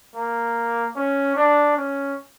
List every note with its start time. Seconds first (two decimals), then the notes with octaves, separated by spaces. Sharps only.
0.15 A#3
0.96 C#4
1.36 D4
1.77 C#4